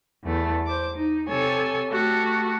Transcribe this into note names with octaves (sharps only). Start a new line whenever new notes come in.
E2 A3
C5 D6
D#4
C3 A4 C#5 G#5
A3 F#4 G4 A4